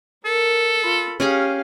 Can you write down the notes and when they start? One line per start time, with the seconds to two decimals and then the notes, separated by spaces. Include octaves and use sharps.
0.25 A4 A#4
0.84 F4 B5
1.20 C#4 G4 G#4 F5 G#5